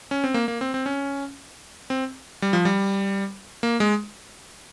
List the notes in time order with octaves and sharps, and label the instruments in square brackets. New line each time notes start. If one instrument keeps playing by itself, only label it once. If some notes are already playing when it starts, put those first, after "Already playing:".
[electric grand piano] C#4
C4
A#3
A#3
C4
C4
C#4
C4
G3
F3
G3
A#3
G#3